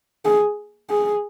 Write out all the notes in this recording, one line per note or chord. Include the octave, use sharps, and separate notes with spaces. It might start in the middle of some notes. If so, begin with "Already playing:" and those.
G#4
G#4